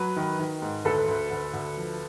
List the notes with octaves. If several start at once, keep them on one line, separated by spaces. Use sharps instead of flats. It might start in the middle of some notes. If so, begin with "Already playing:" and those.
Already playing: F#3 B4
D#3
D#3
G#2
D2 A4 B4
D2
D2
D2
F3